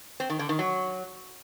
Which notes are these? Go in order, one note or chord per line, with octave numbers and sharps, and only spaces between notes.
C4
D#3
D3
D#3
F#3